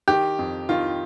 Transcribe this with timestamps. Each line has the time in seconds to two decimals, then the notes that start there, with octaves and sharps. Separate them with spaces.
0.08 D#3 G4
0.39 F2
0.69 D#3 F4